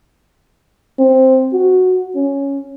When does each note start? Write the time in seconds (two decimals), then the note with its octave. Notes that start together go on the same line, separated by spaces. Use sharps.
0.99 C4
1.53 F#4
2.15 C#4